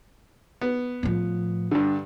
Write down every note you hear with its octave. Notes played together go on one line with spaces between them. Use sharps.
B3
A2 F3
G2 D3